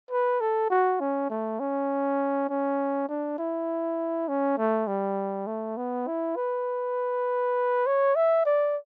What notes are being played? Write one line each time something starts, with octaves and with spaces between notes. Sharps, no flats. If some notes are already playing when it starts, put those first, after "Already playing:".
B4
A4
F#4
C#4
A3
C#4
C#4
D4
E4
C#4
A3
G3
A3
B3
E4
B4
C#5
E5
D5